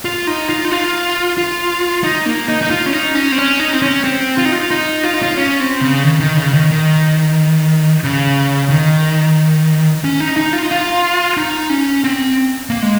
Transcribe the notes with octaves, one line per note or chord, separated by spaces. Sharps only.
F4
D#4
F4
D#4
F4
F4
D#4
A#3
D#4
D#4
F4
C#4
D#4
C#4
C4
C#4
D#4
C4
C#4
C4
F4
D#4
F4
D#4
F4
D#4
F4
C#4
C4
C#3
D#3
D#3
C#3
D#3
D#3
C#3
D#3
C#4
D#4
D#4
F4
D#4
F4
D#4
C#4
C4
A#3
G#3